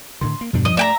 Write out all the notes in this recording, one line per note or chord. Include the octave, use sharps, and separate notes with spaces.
A2 D3 D#3 C6
A#3
E2 G2 B2 G3 D4
F3 D#5
G2 A3 D5 E5 G5 A#5